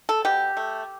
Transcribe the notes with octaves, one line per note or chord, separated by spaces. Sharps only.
A4
B2 G4
A3